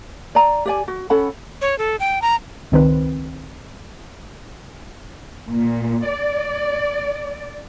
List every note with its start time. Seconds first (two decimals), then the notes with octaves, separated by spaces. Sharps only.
0.35 D5 A#5
0.66 G4 D5 G#5
0.88 F#4
1.10 C#4 A4 F#5 B5
1.61 C#5
1.78 A4
2.00 G5
2.22 A#5
2.72 C#2 D#3 C4 B4
5.49 A#2
6.07 D5